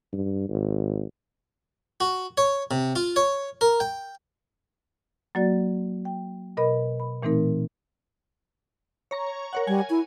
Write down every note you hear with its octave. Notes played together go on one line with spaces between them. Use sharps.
G2
G#1
F#4
C#5
C3
F4
C#5
A#4
G5
F#3 A#3 F#4 D5 A6
G5
B2 A#4 D#5 B5
B5
A#2 E3 A3 C4 D#4 A#4
C#5 A#5 C#6
A#4 C#5 F#5
G3 G#5
E4